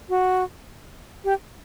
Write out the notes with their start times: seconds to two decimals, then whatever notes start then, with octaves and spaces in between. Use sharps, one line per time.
0.09 F#4
1.24 G4